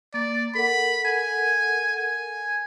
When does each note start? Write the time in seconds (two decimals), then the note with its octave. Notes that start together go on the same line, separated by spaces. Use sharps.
0.14 A#3 D5
0.55 A4 A#4 F#5 B5
1.05 G#5
1.97 G#5